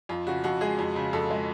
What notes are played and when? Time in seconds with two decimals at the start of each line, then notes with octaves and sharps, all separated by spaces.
0.09 F2 F4
0.27 C#3 F#4
0.44 F2 F#4
0.61 G#3 G#4
0.79 F2
0.96 C#3
1.13 F2 A4
1.30 G#3